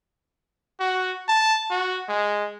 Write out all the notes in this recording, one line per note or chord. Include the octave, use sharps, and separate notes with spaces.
F#4
A5
F#4
G#3